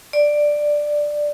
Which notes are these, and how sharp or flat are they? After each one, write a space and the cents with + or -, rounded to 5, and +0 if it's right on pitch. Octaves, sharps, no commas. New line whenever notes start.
D5 +5